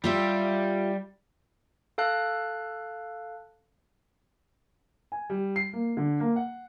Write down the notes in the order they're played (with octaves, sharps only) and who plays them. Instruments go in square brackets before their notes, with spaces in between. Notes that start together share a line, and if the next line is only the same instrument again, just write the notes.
[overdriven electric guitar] G3 [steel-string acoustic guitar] F4 G4 E5
[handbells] A4 F5 A5 F#6
[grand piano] G#5
G3
C7
A#3
D3
A#3
F#5